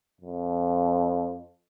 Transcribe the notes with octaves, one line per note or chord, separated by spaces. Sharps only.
F2